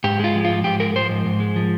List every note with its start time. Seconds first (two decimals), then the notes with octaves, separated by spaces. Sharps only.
0.04 G#2 G4
0.19 G#3 F4
0.35 F3
0.45 G#2 F4
0.64 G#2 G4
0.80 G#3 A#4
0.96 F3 C5
1.10 G#2
1.25 G#2
1.40 G#3
1.56 F3